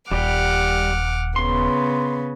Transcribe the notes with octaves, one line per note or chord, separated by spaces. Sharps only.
D#1 G3 G4 F#5 D6 F6
C#3 B3 C6